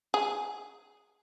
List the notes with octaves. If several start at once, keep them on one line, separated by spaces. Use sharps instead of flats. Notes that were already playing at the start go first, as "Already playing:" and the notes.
G#4